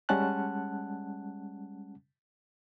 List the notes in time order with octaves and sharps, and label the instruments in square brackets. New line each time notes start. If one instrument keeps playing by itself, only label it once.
[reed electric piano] G3 G#3 C#4 F#5 A5 F#6